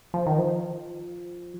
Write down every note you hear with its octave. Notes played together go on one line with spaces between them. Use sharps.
F3
D#3
F3